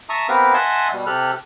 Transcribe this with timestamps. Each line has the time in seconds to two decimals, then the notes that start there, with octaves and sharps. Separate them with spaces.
0.09 E5 A5 A#5 C#6 D#6
0.29 B3 C4 G4 A#4 B4 F5
0.54 D#5 E5 F#5 G#5 A5 C6
0.92 B2 G3
1.06 C3 G4 A4 F6 F#6